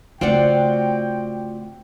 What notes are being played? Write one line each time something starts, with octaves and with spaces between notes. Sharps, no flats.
C#3 A3 C4 F4 F#4 D5 F#5 G5